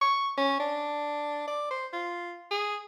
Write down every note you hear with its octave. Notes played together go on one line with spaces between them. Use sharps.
C#6
C#4
D4
D5
C5
F4
G#4